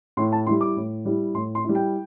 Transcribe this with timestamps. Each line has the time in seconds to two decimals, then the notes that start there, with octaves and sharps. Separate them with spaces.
0.17 A2 C6
0.32 A5
0.47 G3 E4 C6
0.61 D6
0.77 A2
1.05 G3 E4
1.34 A2 C6
1.55 C6
1.65 G3 E4
1.75 G5